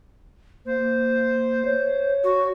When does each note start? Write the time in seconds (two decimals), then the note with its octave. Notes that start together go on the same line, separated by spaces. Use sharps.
0.66 A#3 C5
1.65 C#5
2.24 F#4